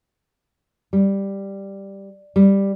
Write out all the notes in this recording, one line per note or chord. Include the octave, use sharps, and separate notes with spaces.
G3
G3